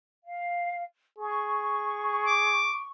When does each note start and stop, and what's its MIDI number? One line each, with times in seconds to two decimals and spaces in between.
0.24 0.81 77
1.19 2.71 68
1.19 2.89 85
2.26 2.80 86